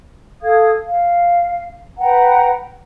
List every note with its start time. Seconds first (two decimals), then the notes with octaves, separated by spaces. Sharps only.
0.43 A4 F5 D#6 G#6
0.86 F5
1.98 B4 F#5 G5 A#5